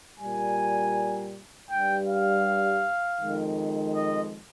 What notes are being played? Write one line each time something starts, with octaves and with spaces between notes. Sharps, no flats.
A#2 G3 G#5
G2 G3 G5
F5
F2 D#3 G#3
D#5